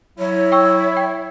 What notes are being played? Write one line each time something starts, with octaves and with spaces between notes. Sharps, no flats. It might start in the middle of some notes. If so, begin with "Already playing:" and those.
F#3 E4 C#5
G5 C#6 E6
G5